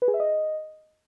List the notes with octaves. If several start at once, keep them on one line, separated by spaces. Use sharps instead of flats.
B4
G#4
E5
D#5